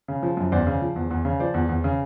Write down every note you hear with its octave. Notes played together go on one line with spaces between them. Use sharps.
C#3
F3
F#2
E2 C5 D5
C#3
F3
E2
E2
C#3
F3 C5 D5
E2
E2
C#3